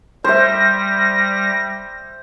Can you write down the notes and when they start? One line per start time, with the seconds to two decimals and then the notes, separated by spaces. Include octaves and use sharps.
0.24 G3 C5 E5 A#6